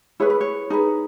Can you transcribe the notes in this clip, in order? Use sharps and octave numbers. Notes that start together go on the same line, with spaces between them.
E4 G#4 B4 C#5
B4
C#5
D#4 G#4 B4